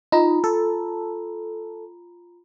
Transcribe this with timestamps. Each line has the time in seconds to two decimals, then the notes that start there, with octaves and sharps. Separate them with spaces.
0.12 D#4 F4 A#5 B5
0.44 A4